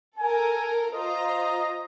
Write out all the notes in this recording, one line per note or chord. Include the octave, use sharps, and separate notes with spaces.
A4 A#4 G#5
F4 C5 D#5 A#5